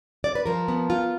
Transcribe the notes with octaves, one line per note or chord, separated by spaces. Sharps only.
D5
B4
F3 A#4
B3
F4